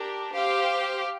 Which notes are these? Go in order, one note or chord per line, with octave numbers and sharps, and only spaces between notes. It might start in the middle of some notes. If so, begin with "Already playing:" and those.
Already playing: D4 G4 A#4
G4 C5 F5